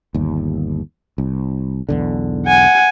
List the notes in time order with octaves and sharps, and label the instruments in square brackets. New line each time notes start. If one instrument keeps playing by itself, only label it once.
[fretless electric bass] G1 D#2
C2
B1 E2 D3
[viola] F#5 G#5